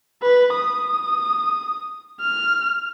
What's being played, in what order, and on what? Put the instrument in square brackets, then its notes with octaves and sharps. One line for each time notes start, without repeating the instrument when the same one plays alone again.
[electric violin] B4
D#6
F6